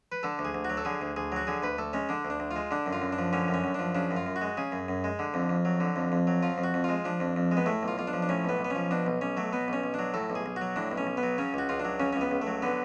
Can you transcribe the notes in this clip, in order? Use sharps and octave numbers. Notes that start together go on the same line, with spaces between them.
B4
D3 A4
D2
G#4
D2
F#4
F#3
A4
D3 G#4
D2
D2 G#4
F#3 F#4
D3 G#4
D2 B4
D2 A4
G#3 C#4
D3 D4
D2
D4
D2
F4
G#3
D3 D4
F#2
F4
F#2
D4
F3
D3 C#4
F#2
C#4
F#2
F3 D4
C#3 D4
F#2
F4
F#2
F#4
G#3
C#3 G#4
F#2
F#2
G#3
D3
F2
F2
F#3
D3
F2
F2
F#3
F3 F4
F2
F#4
F2
G#3 F4
F3 D4
F2
F2
G#3
B3
A2 A3
B1 F4
B1 F4
D4
F3
D4
A2 C#4
B1 B3
B1
B3
F3 C#4
B2 D4
B1
B1 C#4
F#3 A3
B2 B3
B1 C#4
B1
F#3 D4
A2 A4
B1
G#4
B1
F#4
F#3
A2 D4
B1
C#4
B1
B3
F#3
C#3 C#4
C#2 F#4
C#2 F4
D4
F#3
C#3 C#4
C#2 C#4
B3
C#2
A3
F#3
D3 B3